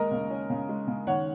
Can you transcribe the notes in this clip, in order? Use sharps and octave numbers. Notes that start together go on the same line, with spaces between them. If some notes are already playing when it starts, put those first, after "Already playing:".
Already playing: D#2 G#3 A#4 D#5
C#3
C#4
C#3
G#3
C#3
D#3 C#5 F#5